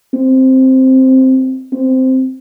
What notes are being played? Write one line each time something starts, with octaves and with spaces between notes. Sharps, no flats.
C4
C4